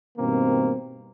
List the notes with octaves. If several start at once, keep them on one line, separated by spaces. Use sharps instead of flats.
G2 B2 D#3 A#3 C4